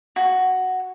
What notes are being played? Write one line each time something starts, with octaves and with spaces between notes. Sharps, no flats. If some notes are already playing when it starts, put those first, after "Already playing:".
F#4